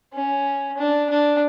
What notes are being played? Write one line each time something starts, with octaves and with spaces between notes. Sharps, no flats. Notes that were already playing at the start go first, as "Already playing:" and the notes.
C#4
D4
D4